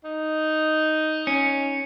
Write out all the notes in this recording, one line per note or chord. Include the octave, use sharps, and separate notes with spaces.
D#4
C#4